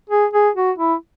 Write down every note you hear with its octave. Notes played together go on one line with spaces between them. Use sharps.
G#4
G#4
F#4
E4